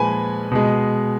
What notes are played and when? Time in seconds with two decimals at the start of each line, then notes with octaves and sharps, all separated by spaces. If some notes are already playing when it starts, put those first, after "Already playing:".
Already playing: A#2 F3 G#3 B4 G#5 B5
0.51 B2 G#3